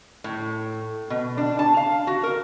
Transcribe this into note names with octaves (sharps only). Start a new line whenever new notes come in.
A2
B2
D4
A5
F5
F#4
A#4